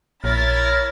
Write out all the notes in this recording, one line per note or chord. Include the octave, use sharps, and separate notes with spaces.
A#1 E4 A#4 C#5 B5 A6